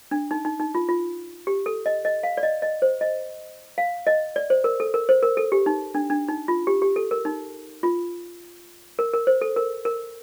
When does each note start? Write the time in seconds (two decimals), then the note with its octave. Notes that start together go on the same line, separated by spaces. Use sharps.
0.11 D4
0.31 D#4
0.45 D#4
0.60 D#4
0.75 F4
0.89 F4
1.47 G4
1.66 A4
1.86 D#5
2.05 D#5
2.23 F5
2.37 D5
2.43 D#5
2.62 D#5
2.82 C5
3.01 D#5
3.78 F5
4.07 D#5
4.36 D5
4.50 C5
4.64 A#4
4.80 A4
4.94 A#4
5.09 C5
5.22 A#4
5.37 A4
5.52 G4
5.66 D#4
5.95 D4
6.10 D4
6.28 D#4
6.48 F4
6.67 G4
6.82 G4
6.96 A4
7.11 A#4
7.25 D#4
7.83 F4
8.99 A#4
9.14 A#4
9.27 C5
9.41 A4
9.56 A#4
9.85 A#4